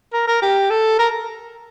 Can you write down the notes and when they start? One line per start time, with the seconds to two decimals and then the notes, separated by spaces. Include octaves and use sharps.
0.13 A#4
0.28 A#4
0.42 G4
0.70 A4
0.99 A#4